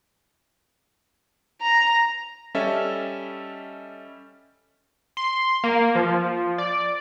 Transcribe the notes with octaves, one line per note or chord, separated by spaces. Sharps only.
A#5
G3 C#4 A4 D#5 E5
C6
A#3
F3
D5